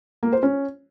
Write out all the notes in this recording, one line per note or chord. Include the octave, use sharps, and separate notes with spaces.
A#3
C5
C#4